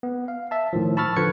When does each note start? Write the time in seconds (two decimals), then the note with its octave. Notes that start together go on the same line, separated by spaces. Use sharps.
0.03 B3
0.28 F5
0.51 E5 A5
0.73 A2 D#3 F3
0.97 A5 B5 C#6 E6 F6 A6
1.16 D3 F3 B4 C#6 G#6 C#7